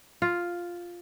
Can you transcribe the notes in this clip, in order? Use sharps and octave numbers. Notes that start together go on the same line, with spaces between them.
F4